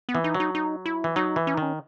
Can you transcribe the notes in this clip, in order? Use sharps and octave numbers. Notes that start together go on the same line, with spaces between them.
B3
E3
D#4
F#3
D#4
D#4
E4
E3
F#3 D#4
E3
C#4
D#4
D#3 C#4